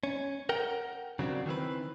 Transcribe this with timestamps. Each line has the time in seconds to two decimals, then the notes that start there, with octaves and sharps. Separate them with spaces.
0.03 C#4
0.49 A#4 F#5 G5
1.19 C#3 F#3 C4 D4
1.46 D#3 E3 C4 B4